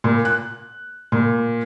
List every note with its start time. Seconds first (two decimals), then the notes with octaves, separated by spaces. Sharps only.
0.04 A#2
0.25 F#6
1.12 A#2